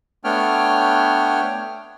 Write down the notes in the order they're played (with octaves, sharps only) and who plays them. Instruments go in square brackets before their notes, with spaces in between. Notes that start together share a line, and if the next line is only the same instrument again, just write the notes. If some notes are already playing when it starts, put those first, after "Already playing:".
[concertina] A3 B3 D4 C#5 G5 F6